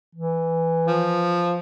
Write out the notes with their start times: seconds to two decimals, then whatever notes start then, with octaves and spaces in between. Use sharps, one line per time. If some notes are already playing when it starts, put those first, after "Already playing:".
0.15 E3
0.87 F3